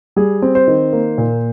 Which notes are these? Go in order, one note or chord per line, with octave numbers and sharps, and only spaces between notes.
G3 G#4
C4
C5
D#3
A#3
A#2